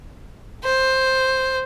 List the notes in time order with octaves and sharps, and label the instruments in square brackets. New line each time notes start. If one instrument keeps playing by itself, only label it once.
[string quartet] C5